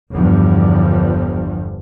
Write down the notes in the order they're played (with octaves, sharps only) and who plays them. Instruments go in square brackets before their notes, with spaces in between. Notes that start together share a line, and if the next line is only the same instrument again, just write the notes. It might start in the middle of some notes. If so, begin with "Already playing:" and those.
[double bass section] G1 E2 G2 F3